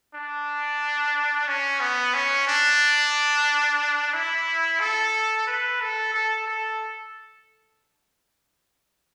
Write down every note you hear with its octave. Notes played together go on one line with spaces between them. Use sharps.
D4
C#4
B3
C#4
D4
E4
A4
B4
A4
A4
A4